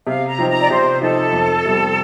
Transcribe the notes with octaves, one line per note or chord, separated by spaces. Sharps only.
C3 F5
A#5
F3 C4 D#4
A#5
D5
C3 C5
F3 C4 D#4 A4
F2
C3 G3 C4